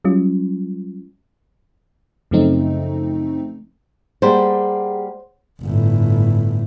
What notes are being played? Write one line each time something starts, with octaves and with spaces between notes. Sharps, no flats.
F#3 G3 C#4 F4
F#2 C#3 F3 A3 C4 D#4
G3 A#3 G4 G#4 C5 F#5
G1 A2